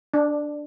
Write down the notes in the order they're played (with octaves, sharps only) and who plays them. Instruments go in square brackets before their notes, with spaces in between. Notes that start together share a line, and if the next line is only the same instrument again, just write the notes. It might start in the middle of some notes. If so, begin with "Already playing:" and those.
[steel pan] D4